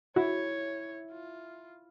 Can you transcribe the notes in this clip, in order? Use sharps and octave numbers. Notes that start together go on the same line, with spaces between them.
E4 F#4 C#5
F4